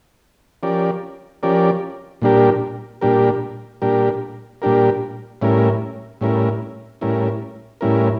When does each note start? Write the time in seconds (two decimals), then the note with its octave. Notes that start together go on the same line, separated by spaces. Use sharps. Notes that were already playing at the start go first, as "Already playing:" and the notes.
0.63 F3 C#4 G4 A#4 D5
1.43 F3 C#4 G4 A#4 D5
2.22 A#2 G3 D4 G4 A#4
3.01 A#2 G3 D4 G4 A#4
3.82 A#2 G3 D4 G4 A#4
4.62 A#2 G3 D4 G4 A#4
5.42 A2 G3 C#4 E4 A#4
6.21 A2 G3 C#4 E4 A#4
7.01 A2 G3 C#4 E4 A#4
7.81 A2 G3 C#4 E4 A#4